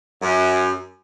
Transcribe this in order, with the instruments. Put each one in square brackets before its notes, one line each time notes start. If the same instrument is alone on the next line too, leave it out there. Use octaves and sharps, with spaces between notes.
[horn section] F#2